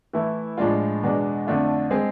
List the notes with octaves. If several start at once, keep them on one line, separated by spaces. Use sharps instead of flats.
E3 A3 E4
A2 F3 G#3 D4 F4
E2 B2 G#3 D4
F2 D3 A3 D4 F4
G#3 C4 G#4